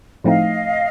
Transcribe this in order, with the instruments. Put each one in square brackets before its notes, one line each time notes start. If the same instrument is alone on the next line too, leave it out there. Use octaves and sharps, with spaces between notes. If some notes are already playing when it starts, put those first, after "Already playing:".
[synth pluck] A2 F3 A3 C4 D#4 [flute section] D#5 F5